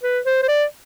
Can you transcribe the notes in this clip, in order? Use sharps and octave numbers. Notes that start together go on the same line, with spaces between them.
B4
C5
C5
D5